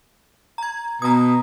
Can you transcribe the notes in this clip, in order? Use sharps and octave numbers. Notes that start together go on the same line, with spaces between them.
A#5 G#6
B2 A#5 D#6